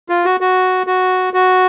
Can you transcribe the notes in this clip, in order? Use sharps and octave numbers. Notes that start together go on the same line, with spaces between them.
F4
F#4
F#4
F#4
F#4